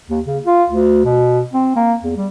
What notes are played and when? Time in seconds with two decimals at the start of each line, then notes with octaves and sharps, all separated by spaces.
0.10 D#2
0.26 C#3
0.46 F4
0.70 D2
1.05 B2
1.54 C4
1.76 A#3
2.04 E2
2.17 G3